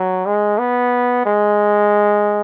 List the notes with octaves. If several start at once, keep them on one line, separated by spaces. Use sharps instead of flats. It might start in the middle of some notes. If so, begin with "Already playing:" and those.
Already playing: F#3
G#3
B3
G#3